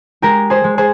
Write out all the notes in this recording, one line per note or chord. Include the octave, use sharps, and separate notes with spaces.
G#3 G4 A#4
G#4 C5
G#3
G#4 C5